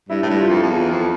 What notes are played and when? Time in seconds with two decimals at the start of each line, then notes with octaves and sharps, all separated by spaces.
0.09 G2 E4
0.23 A2 E4
0.30 G2
0.40 F4
0.50 F2
0.63 F2
0.70 E2
0.91 F2